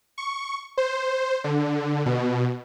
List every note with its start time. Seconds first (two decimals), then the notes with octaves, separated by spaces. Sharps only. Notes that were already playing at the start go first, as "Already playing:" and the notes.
0.18 C#6
0.77 C5
1.44 D3
2.06 B2